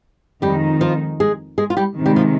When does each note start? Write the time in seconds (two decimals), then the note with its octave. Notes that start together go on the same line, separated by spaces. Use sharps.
0.42 F2 D#3 G3 G#3 D#4 G4
0.81 F3 F4
1.20 G#3 G#4
1.58 G#3 G#4
1.70 F4
1.77 G3 G4
1.96 C3 D#3 G#3
2.06 G3 G4
2.16 F3 F4